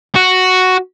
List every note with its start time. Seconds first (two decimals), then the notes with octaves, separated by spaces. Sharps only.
0.15 F#4